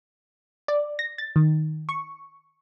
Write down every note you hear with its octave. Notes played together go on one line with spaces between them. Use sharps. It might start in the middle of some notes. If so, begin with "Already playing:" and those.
D5
A#6
A6
D#3
C#6